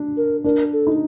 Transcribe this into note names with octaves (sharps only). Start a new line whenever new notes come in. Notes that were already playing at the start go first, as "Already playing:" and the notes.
Already playing: D4
A#4
D4 A#4
A4
D#4